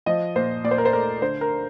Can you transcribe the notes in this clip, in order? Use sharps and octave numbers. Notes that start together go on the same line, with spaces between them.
F3 D#5
A#2 C5
A#2 D5
C5
A#4
C5
A3 A#4
D3 C5
A#4